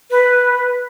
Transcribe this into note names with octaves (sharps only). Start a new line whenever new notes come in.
B4